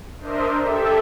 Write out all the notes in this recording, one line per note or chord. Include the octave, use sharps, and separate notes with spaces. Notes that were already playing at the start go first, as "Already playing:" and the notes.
D4 A#4 C5 D#5 E5
G4 A4 E5